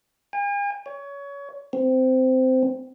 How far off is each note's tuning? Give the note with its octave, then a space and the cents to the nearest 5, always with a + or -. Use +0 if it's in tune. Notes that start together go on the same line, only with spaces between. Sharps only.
G#5 -45
C#5 +25
C4 -15